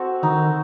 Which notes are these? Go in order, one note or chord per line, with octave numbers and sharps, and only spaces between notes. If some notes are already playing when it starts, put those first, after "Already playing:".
Already playing: C4 F#4 A4
D#3 D#4